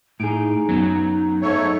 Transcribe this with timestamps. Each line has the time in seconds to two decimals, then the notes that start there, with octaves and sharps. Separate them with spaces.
0.20 A2 D#4 G#4 D7
0.69 F#2 F#3 B3
1.42 G#2 A3 A4 C#5